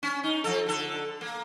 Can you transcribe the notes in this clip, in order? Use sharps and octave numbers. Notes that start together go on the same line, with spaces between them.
C#4
D#4
F3 A4
D3 A4
A#3